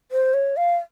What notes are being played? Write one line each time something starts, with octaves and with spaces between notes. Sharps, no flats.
C5
C#5
F5